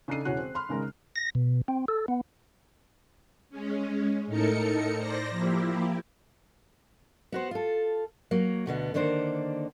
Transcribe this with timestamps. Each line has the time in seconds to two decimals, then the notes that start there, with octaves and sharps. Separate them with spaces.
0.08 C#3 D4 D#4 A4 C7 D#7
0.25 E1 E3 C#4 F#4 F#6
0.38 C4
0.55 B5 C6 F6
0.69 G#1 C#3 G#3 A#4
1.16 A#6
1.35 B2
1.68 C4
1.88 A4
2.08 B3
3.50 G#3 C#4
4.27 A2 D#4 A4 A#4 C#7
4.96 C5 D5 A#6
5.30 F3 A#3 E4 G4
7.32 B3 F#4 C5
7.51 F4 A4
8.31 F#3 A#3
8.66 D2 B2 D3 B3
8.94 D3 D#3 A#3 D4 C5